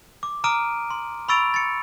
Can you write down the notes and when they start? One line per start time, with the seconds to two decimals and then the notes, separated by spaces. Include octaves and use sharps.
0.23 D6
0.44 A#5 D6 D#6 F6 D7 D#7
0.90 C6
1.29 B5 C#6 E6 A6 D7 F7
1.54 A6 C#7